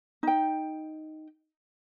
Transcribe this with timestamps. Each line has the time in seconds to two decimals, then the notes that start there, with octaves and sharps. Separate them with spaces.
0.23 D#4 G5